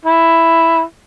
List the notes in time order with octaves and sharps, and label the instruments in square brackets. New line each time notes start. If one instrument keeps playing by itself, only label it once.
[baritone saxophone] E4